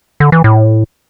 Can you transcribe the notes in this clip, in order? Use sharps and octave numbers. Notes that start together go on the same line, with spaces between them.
D3
E3
A2